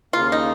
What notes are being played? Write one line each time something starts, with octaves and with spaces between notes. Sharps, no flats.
D#2 C#3 A#3 F4
D#4